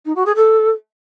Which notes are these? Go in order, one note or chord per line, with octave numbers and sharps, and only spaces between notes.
D#4
F#4
G#4
A4